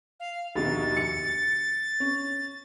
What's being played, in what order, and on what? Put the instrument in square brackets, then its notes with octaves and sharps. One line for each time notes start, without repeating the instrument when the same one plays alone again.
[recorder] F5
[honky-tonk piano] A#1 D#2 B2 [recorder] A6
[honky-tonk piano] C#7
C#4